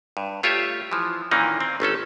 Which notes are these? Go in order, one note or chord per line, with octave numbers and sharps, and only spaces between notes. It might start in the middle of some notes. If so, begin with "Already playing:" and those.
G2
A3 F4 G4 C#5 E5
E3 F3
A#2 D#3 E3 A#3 C#4 D#4
C4
G1 A3 C#4 A4